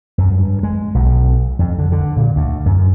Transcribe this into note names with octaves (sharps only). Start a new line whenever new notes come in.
F#2
G2
G#3
B1
F2
D3
D3
A#2
D2
F#2